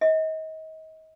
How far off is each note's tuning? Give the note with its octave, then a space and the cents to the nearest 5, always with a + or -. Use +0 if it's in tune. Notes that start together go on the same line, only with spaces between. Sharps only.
D#5 +35